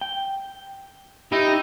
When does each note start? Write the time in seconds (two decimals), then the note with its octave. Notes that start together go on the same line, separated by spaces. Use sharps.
0.01 G5
1.32 D#4 E4 G4